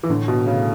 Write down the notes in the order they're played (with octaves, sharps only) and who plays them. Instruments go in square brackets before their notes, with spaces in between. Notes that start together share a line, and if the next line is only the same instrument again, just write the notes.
[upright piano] E3
[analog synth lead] A2 [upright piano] D3
[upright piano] B2
C#3